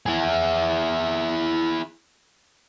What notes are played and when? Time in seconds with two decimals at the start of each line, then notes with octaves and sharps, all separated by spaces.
0.06 E4 G#4